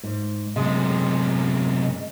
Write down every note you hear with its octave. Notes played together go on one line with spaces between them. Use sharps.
G#2
F#2 C3 G#3